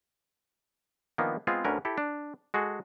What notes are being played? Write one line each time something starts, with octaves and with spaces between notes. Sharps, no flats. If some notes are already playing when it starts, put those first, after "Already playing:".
D#3 F3 A#3 B3 D4
G#3 B3 C4 F4 G#4
D2 D3 C#4 A#4 B4
E4 G4 A4
D4
G#3 F#4 G#4 A4